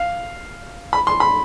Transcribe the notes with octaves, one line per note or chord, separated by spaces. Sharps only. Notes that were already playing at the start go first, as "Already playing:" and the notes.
Already playing: F5
B5
C6
B5